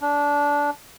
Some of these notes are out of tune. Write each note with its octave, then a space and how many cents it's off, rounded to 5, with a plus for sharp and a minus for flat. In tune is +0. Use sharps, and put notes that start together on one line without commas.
D4 -20